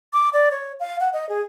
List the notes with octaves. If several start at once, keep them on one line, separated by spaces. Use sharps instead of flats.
D6
D5
C#5
F5
F#5
D#5
G#4